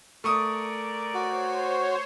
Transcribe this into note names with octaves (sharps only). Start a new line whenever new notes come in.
A3 A#4 D5 C#6 D#6
F#4 C5 C#5